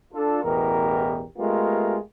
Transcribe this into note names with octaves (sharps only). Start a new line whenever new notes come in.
D4 F4 A4
A1 E2 B2 G4 A#4
G#3 A3 B3 F4 G4 A#4